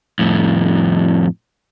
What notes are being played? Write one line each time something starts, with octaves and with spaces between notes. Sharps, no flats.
F2 A2